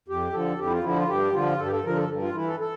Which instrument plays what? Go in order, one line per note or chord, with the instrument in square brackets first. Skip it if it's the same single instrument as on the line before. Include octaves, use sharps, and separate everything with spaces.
[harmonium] F2 G4
D3 F3 A4
F2 G4
E4
F4
D3 F3 E4
F4
G2 G4
D3 F3 F4
G2 A4
G4
A4
D3 F3 A#4
A4
G2
F4
E3 E4
A4
A4